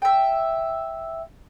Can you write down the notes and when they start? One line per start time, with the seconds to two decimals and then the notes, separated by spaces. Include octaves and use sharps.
0.02 E5 G5